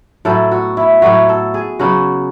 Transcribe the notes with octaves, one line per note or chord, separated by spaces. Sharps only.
A2 F#3 B3 A4
F#4
E4
A2 F#3 B3 F#4
A4
G#4
C#3 F#3 B3 F#4